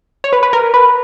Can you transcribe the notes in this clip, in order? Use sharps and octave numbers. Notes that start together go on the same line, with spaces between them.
C#5
B4
B4
A#4
B4